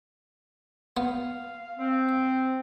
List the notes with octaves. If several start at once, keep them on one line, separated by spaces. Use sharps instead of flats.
B3 F5
C4